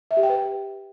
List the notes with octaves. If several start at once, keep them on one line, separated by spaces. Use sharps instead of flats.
E5
G4
G5
B4